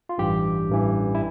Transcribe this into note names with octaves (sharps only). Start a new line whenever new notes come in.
F4
A1 G2 E3 G4
A1 G2 E3
E4